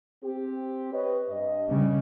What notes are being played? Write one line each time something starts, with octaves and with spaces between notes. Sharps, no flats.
C4 G4
B4 C#5 D#5
G2 D#5
C#3 G3